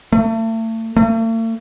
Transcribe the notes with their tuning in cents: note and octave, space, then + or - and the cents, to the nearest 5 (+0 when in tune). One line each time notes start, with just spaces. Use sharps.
A3 +35
A3 +45